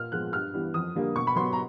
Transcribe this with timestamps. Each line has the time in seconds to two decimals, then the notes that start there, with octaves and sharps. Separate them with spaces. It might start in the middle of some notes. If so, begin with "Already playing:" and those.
Already playing: A#2 F6
0.12 F3 G#3 B3 F#6
0.33 G2 F6
0.53 E3 G3 B3
0.74 F2 D#6
0.95 D3 G3 A#3
1.15 B2 C#6
1.27 B5
1.36 F#3 B3 C6
1.53 A#5